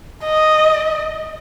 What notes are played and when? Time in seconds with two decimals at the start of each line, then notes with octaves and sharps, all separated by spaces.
0.24 D#5